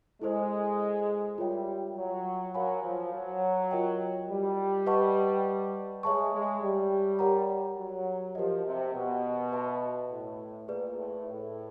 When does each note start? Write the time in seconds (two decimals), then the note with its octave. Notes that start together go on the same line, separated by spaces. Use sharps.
0.22 G#3 E4 A4 C5 D#5
1.38 G3 F4 A#4 C#5 E5 G5
1.96 F#3
2.54 F#3 A#4 C#5 F5 G#5 B5
2.84 F3
3.13 F#3
3.71 F4 A#4 D#5 G5
4.29 G3
4.86 B4 D#5 F#5 A5 C#6
6.03 G#3 C#5 E5 A5 C#6
6.32 G#3
6.62 G3
7.19 G4 A#4 C#5 F#5 A#5
7.77 F#3
8.35 F3 G4 A#4 D#5
8.65 C3
8.94 B2
9.52 B4 E5 A5 C6
10.10 A2
10.68 A#2 G#4 B4 D5
10.97 A2
11.26 A2